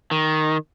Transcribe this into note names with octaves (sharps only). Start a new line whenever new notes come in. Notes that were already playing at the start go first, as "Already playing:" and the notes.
D#3